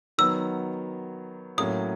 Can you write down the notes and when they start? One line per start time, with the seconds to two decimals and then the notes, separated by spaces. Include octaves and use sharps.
0.18 D#3 F#3 B3 E6
1.58 A2 F#3 A#3 C#4 D#6